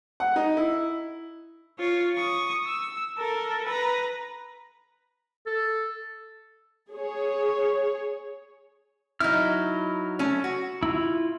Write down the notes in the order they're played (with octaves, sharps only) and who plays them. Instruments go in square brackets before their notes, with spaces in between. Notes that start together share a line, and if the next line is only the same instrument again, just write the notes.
[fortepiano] F#5
D#4
E4
[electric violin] F4 C#5
C#6 D#6
E6
A4 A#4
B4 A#5
[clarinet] A4
[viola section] G#4 C#5
[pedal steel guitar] F#3 F6 [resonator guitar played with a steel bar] D#4 E4
[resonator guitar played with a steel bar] A3 C#4
F#4
[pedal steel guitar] E4 F4